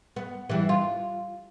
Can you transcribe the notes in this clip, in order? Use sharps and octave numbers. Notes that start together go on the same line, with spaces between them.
B3
E3 G3 D4
F4